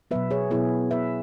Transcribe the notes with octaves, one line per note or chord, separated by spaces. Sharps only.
B2 F#3 B3 B4 E5
G#4 C#5
B2 F#3 B3 E4 G#4
B2 B3 B4 E5